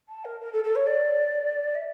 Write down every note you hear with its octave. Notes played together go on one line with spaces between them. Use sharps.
A5
A#4
A#4
A4
A4
C#5
D5
E5